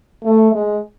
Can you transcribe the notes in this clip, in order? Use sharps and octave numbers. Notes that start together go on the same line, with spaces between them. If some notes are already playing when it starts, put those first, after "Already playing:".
A3
G#3